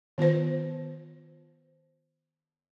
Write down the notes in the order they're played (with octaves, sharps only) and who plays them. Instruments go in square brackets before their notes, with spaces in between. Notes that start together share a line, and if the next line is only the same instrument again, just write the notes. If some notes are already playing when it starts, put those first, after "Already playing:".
[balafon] D#3 B3 F4 B4 C5